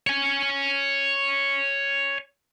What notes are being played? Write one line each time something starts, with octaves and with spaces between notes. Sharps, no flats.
C#5 G#5